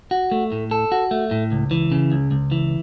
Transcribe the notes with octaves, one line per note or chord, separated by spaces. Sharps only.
F#4
A3
A2
A4
F#4
A3
A2
C#2
E3
C#3
C#2
C#2
E3